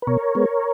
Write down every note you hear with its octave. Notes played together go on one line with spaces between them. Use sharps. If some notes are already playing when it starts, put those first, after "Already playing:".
B4
B2 A#4 C#5
G#3 B3